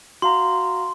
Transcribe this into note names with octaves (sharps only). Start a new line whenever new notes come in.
F#4 F5 A#5 C6